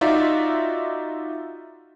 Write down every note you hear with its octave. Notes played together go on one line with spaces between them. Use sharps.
D#4 F4 F#4 D5 E5